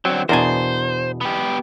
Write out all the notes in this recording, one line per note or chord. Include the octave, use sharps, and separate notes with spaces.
D3 F#3 C4
E2 B2 D4 A#4 C5 G#5
B3 G4